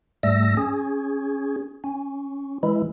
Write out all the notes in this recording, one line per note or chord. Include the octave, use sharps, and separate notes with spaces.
G#2 G3 A3 E6 A#6
C#4 G#4
C#4
E3 G#3 E4